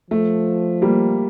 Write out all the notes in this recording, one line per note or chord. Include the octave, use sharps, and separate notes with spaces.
F3 A3
G3 A#3